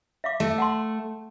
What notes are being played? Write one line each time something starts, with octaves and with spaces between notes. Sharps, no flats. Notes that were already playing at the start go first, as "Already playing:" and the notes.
E5 F5 D6
A3 E5
F#5 A5 C6